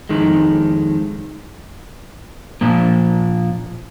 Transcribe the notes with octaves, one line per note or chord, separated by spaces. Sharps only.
F2 D#3 G#3
A#2 F3 A#3